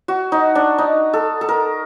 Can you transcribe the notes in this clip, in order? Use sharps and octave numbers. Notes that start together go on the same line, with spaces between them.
F#4
D#4
D4
D#4
A4
A4
A#4